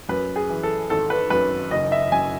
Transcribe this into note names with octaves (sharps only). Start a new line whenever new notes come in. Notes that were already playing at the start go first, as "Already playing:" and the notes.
F#2 B4
G#4
E3
A4
G#1 A4
B4
F#2 B4
F#1 D#5
E5
F#2 G#5